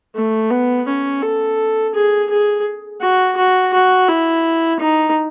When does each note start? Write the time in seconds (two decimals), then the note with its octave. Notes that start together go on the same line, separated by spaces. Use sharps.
0.15 A3
0.51 B3
0.87 C#4
1.23 A4
1.94 G#4
2.30 G#4
3.01 F#4
3.37 F#4
3.73 F#4
4.08 E4
4.79 D#4